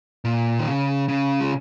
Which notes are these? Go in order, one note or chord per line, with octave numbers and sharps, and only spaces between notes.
A#2
D#3
C#3
C#3
G#3